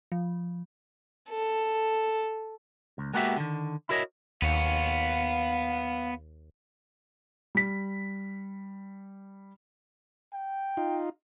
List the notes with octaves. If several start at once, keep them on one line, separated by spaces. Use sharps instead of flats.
F3
A4
C#2
G#3 A#3 B3 F#4 G4 E5
D3 D#3
E4 F#4 A#4 C#5 D#5
D#2 B3 C#5 F5
G3 B6
G5
D#4 F4